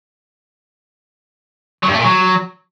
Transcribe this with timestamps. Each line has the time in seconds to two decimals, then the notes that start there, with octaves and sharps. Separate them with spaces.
1.83 F#3
1.88 G2
1.94 A3
1.99 A#2
2.04 F#3